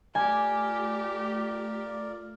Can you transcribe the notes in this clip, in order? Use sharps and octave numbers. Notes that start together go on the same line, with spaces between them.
A3 F4 G4 A#4 D5 G#5